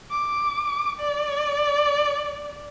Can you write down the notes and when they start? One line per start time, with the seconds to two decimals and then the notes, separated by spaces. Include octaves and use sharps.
0.10 D6
1.00 D5